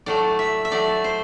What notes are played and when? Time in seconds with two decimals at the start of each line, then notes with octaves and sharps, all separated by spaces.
0.06 A2 F#3 A3 D5
0.39 E5
0.65 E5
0.71 A2 F#3 A3 D5
1.04 C5